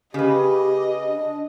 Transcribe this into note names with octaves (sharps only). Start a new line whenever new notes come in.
C#3 G4 B4 D#5
D4